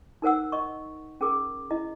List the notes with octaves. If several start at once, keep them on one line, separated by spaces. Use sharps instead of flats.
D#4 A#4 C5 F#5 E6
D#5 C#6
C#4 G#4 A#4 D6
E4 D#5